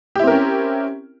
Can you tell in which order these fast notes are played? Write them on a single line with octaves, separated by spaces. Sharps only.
G4 E4 C4 A#4 C#4